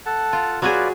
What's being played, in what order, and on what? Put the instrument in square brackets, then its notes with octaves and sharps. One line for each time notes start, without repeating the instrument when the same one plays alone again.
[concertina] A4 F#5 A5
[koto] F4
[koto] F#3 F#4 G#4 [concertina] F4 B4 D5